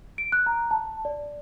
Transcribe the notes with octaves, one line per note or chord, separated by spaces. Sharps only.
D7
F#6
A#5
A5
D5